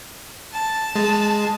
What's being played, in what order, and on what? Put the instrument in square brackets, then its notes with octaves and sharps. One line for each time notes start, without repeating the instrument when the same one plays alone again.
[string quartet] A5
[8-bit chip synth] G#3